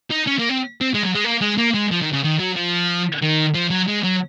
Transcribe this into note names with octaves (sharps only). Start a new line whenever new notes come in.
D#4
C#4
A#3
C4
C4
G#3
F#3
G#3
A#3
G#3
A#3
G#3
F3
D#3
C#3
D#3
F#3
F3
D#3
F3
F#3
G#3
F#3